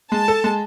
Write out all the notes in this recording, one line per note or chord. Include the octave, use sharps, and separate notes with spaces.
G#3 A5
A4
G#3